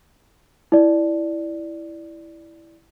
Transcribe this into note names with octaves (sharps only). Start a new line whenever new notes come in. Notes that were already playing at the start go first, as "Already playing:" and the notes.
E4 D5